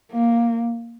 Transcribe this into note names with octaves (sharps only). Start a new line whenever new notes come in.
A#3